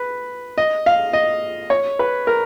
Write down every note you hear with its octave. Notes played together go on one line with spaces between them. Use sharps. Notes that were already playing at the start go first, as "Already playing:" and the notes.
Already playing: B4
D#5
F5
D#5
C#5
B4
A#4